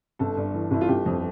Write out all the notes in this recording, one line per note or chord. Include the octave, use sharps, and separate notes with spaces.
G1 A4
G2
E3
G1 E4
F4
G1 G4
F2